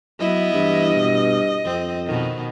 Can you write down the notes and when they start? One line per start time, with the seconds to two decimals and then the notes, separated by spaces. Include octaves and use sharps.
0.20 F#3 B3 E4 D#5
0.54 G2 E3
0.95 B2
1.65 F2 C4
2.06 B2 D#3